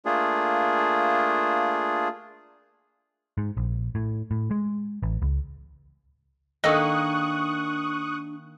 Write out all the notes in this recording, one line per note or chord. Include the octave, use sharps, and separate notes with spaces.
A3 A#3 D4 F4 G#4
G#2
A#1
A2
A2
G#3
A1
C#2
D#3 A#3 D4 A4 D#5 C#6 D#6 F#6